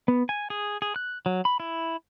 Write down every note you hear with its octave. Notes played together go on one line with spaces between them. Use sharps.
B3
G#5
G#4
G#4
F#6
F#3
B5
E4